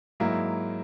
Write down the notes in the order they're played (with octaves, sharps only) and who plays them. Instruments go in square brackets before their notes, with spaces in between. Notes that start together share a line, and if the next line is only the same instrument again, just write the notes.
[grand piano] G#2 F#3 A#3 E4